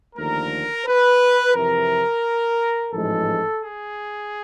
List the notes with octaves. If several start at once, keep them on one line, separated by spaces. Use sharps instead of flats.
D#2 D3 F3 A3 A#4
B4
F2 C3 E3 A#4
A1 G#2 F3 G#3 A4
G#4